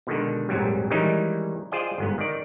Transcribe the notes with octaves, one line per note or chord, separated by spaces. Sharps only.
B2 D3 D#3 G#3
A#1 F2 G#2 F#3 G3
D#3 E3 G3 G#3 C#4 D#4
F4 G#4 C5 D5 D#5 G5
G1 G#2 B3
D#3 D5